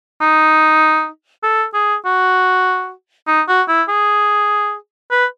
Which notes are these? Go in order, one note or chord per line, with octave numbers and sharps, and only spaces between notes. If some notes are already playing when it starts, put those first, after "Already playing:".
D#4
A4
G#4
F#4
D#4
F#4
E4
G#4
B4